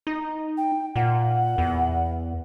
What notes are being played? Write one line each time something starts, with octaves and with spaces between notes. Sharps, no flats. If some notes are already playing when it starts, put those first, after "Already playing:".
D#4
G5
A#2 F#5
E2